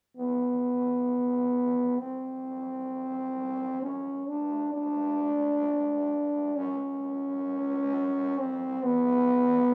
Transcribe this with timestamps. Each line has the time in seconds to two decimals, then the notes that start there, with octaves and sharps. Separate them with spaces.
0.17 B3
2.00 C4
3.82 C#4
4.28 D4
4.73 D4
6.56 C#4
8.38 C4
8.84 B3